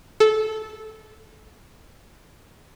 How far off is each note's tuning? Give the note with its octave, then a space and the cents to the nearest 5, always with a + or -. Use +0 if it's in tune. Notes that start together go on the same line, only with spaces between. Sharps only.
A4 -15